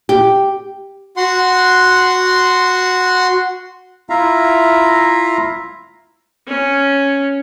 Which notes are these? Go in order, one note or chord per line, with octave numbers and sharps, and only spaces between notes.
G4
F#4 F#5 C6
E4 F4 E5 F5 A#5
C#4